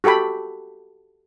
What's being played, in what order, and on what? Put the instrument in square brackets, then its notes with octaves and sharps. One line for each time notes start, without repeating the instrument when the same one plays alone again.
[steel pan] F#4 G4 A4 G5 B5